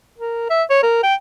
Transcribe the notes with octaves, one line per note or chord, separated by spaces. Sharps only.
A#4
E5
C#5
A#4
G5